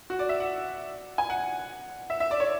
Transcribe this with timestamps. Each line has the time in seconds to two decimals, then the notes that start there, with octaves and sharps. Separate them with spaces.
0.10 F#4
0.19 D5
0.29 E5
0.40 F#5
1.18 G#5
1.30 F#5
2.10 E5
2.20 E5
2.31 D5
2.40 C#5